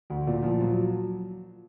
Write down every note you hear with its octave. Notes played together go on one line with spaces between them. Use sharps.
D2
A#2
F3
F#3